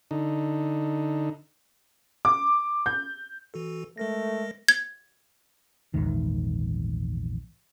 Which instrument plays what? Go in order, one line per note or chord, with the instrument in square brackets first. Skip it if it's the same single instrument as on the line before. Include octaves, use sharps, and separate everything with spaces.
[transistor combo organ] D3 D#4
[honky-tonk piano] D6
G6
[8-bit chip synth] E3 F#4 A4
[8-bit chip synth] G#3 A#4 A#6 [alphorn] A3
[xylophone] G#6
[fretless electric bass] A#1 E2 G#2 D#3